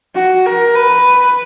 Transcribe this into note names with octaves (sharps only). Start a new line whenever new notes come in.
F#4
A#4
B4